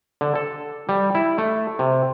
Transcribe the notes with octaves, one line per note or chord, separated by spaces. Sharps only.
D3
A4
G3
E4
A3
C3